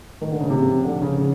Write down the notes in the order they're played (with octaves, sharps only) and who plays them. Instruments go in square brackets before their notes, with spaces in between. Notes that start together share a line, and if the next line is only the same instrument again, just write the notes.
[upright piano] D#3
D3
C#3
[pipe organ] G#2 F3 A#3 [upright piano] C3
[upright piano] D3
C#3
C#3